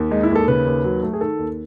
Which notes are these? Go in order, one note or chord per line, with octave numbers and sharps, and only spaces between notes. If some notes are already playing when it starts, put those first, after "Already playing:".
Already playing: D#2
G#3 D#4
E4
D#2
A4
C#3 B4
D#2
F#3
A3
G#4
D#3 A4
D#2